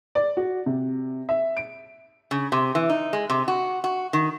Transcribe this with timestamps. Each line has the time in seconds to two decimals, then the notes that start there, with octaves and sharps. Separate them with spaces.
0.15 D5
0.37 F#4
0.66 C3
1.29 E5
1.57 D7
2.31 C#3
2.52 C3
2.75 E3
2.89 D#4
3.13 G#3
3.30 C3
3.48 F#4
3.84 F#4
4.13 D#3